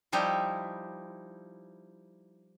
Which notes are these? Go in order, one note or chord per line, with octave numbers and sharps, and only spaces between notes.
F3 G3 D#4 E4